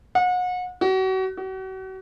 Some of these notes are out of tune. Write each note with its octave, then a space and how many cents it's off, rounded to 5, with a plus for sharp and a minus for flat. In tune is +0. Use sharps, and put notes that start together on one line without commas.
F#5 -35
F#4 +35
F#4 +40